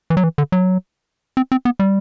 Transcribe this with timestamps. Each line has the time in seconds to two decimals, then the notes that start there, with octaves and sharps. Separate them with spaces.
0.10 E3
0.17 F#3
0.24 E3
0.38 D3
0.52 F#3
1.37 C4
1.52 C4
1.65 B3
1.79 G3